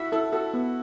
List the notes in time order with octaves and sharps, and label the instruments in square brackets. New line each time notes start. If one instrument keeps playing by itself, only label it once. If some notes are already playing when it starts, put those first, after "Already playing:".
Already playing: [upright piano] E4 F#4 [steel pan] E5
[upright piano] E4 [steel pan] A4
[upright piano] F#4 [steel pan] A4
[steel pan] B3